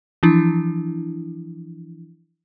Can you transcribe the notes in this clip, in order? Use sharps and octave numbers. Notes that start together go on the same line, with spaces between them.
E3 F3 D4 E4